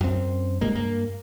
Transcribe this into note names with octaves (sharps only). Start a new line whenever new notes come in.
F#2 C4
G2 C3 G#3 A#3
G2 A#3